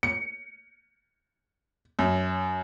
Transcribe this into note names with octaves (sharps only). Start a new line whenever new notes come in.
C#7
F#2